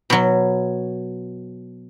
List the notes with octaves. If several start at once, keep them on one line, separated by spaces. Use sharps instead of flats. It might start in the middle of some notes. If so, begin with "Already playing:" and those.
B2 F#3